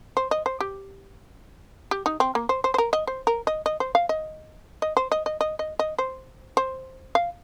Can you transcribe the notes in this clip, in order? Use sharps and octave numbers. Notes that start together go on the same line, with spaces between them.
C5
D#5
C5
G4
G4
D#4
C4
A#3
C5
C5
C5
A#4
D#5
C5
A#4
D#5
D#5
C5
F5
D#5
D#5
C5
D#5
D#5
D#5
D#5
D#5
C5
C5
F5